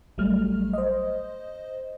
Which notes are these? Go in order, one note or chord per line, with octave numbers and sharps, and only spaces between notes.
A1 F#3 G3 A3 F6
C5 D#5